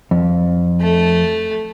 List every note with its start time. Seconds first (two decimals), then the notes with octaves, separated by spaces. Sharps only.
0.11 F2
0.80 A3